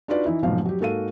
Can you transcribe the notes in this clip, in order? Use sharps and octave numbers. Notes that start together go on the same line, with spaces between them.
D4 D#4 F4 F#4 B4 D5
E3 D#4 E4
F1 G#2 B2 F3 F#3 F5
F#3 G4
G#2 A#3 F#4 A4 F5 D#7